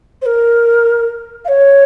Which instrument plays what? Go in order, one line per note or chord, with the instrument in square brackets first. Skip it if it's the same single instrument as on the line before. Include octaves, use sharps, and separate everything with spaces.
[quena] C5
A#4
F5
C#5